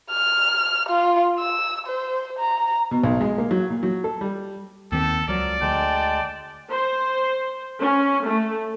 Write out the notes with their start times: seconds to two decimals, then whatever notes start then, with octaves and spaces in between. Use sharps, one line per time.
0.10 F6
0.89 F4
1.39 E6
1.86 C5
2.38 A#5
2.91 B2
3.04 B1
3.21 G#3
3.38 A#3
3.51 F#3
3.70 A#2
3.83 F#3
4.04 A4
4.21 G3
4.92 D#2 D#3 C4 G4 A4
5.28 C#2 F3 F#3 A#4 D5
5.62 D2 G#3 G5 A5
6.70 C5
7.80 C#4
8.27 A3